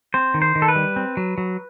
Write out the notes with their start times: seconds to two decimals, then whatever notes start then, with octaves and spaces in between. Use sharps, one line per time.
0.14 C4 C5
0.34 D#3
0.42 C5
0.55 D#3
0.62 A4
0.68 B4
0.76 G3
0.96 C4
1.17 F#3
1.38 F#3